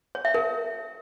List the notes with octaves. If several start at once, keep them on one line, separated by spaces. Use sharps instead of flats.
C#5
E5
A#4